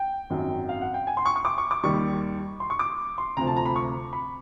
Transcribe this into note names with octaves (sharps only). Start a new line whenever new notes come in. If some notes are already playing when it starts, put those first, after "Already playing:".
Already playing: G5
G#1 F#2 D#3 F#3
F5
F#5
G5
G#5
C6
C#6
C#6
D6
C#6
D6
D#2 D#3 G3 C#6
C6
C#6
D6
C6
D2 C3 F3 A#5
A5
A#5
B5
C#6
B5